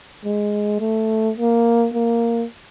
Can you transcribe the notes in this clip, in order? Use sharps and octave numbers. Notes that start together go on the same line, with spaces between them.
G#3
A3
A#3
A#3